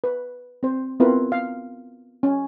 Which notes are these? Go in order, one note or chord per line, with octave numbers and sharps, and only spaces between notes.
B4
C4 C5
B3 C4 E4 F4 A#4 B4
F5
C#4